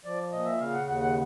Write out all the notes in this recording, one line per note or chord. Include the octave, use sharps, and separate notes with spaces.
F3 D5
A#2 D#5
E5
C#3 F5
F#5
D#2 F#5
F#5